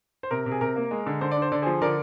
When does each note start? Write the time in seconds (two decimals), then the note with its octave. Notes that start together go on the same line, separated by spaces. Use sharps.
0.23 C5
0.31 C3 A#4
0.46 C3
0.52 G#4
0.61 C3 A#4
0.76 A#3
0.91 G#3
1.06 D3
1.21 D3 C5
1.31 D4 D5
1.42 C5
1.52 D3 D5
1.62 F3 G#4 C5
1.81 D3 A#4 D5